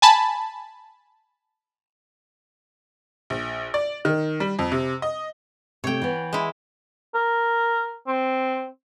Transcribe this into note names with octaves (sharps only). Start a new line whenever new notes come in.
G#5 A5 B5
A#1
D5
D#3
G3
F2
C3
D#5
C3 A3 C#5 G5
E3 B3
G#3 E4
A#4
C4